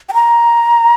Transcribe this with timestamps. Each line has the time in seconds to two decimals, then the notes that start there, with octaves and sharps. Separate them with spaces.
0.09 G5
0.14 A#5